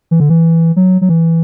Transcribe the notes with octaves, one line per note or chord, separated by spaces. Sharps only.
E3
D3
E3
F#3
F#3
E3